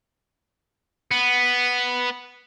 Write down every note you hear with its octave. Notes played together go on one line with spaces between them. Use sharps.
B3